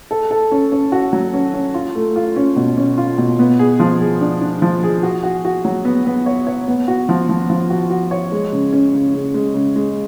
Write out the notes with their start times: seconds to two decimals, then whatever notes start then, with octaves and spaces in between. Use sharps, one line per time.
0.11 A4
0.31 A4
0.51 C#4
0.72 C#4
0.92 F#4
1.13 F#3
1.33 C#4
1.53 C#4
1.74 F4
1.95 A3
2.16 F4
2.36 C#4
2.56 B2
2.77 C#4
2.98 F4
3.18 B2
3.39 B3
3.59 G#4
3.80 F3
4.00 G#4
4.21 D4
4.41 D4
4.62 F3
4.83 G#4
5.03 F#4
5.23 F#4
5.45 F#4
5.65 F#3
5.85 B3
6.06 B3
6.26 C#5
6.47 C#5
6.68 B3
6.88 F#4
7.09 F3
7.29 F3
7.50 F3
7.70 F#4
7.90 F#4
8.11 C#5
8.32 G#3
8.52 C#3
8.73 C#4
8.94 C#3
9.14 C#3
9.34 G#3
9.55 C#3
9.76 G#3